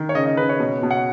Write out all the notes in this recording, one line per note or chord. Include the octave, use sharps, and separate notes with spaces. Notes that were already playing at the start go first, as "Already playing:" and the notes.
Already playing: D#3
C#5
C#3 D#5
D#5
C#3 B4
C#5
B2
B2
F#5